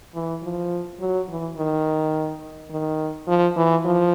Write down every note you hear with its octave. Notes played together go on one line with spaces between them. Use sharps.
E3
F3
F#3
E3
D#3
D#3
F3
E3
F3